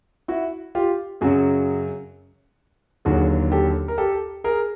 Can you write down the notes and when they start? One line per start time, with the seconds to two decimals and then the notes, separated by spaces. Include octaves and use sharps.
0.28 E4 F#4
0.75 F4 G4
1.21 F#2 C#3 F#3 F#4 G#4
3.05 D#2 D3 F#3 F#4 G#4
3.52 G4 A4
3.88 A#4
3.98 G4 A4
4.44 G#4 A#4